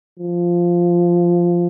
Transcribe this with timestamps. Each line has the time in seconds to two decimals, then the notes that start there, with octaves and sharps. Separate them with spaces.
0.19 F3